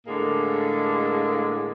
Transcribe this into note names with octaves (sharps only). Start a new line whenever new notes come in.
A2 D3 G#3 A#3